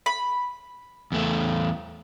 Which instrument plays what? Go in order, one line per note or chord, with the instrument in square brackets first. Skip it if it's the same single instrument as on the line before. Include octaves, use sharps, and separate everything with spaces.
[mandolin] B5
[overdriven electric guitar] E2 A3